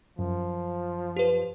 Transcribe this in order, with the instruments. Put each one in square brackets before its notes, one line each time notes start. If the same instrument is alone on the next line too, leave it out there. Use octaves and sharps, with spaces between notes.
[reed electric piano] F#2 [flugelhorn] F3
[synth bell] G4 B4